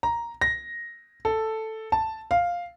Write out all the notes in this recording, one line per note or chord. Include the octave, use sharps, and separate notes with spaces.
A#5
A#6
A4
A5
F5